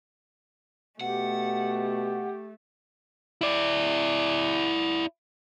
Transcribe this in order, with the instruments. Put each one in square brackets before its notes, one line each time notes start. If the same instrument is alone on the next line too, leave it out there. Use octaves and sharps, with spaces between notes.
[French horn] B2 [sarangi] A3 [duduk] G4 [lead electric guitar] F#5
[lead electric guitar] E4 D5